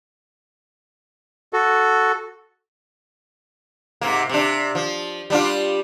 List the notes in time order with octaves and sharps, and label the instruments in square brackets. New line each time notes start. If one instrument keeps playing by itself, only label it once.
[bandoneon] F#4 A4
[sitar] G#2 C3 A#3
C3 D4
F3
G3 D4 F4